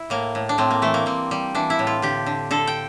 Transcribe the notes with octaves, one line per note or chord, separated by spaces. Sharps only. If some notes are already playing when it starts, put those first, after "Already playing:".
Already playing: E4
A2 A#3
A2
D4
A2 C4
A#3
E3 A3
A#3
G3 C4
G3
E3 D4
E4
A2
F4
D3 G4
D3
D3 A4
G5